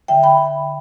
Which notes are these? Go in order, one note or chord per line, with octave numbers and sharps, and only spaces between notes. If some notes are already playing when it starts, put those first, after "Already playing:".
D3 E5 G5
G5 B5